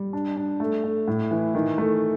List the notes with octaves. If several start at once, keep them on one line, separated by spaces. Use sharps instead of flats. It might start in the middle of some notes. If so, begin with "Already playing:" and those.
Already playing: G3
D4
D4
A3
A3
A2
E3
D#3
A3